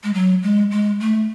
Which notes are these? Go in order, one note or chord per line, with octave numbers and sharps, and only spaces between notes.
G#3
F#3
G#3
G#3
A3